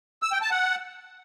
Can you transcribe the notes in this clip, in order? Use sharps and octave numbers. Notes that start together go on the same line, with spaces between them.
E6
G5
A5
F#5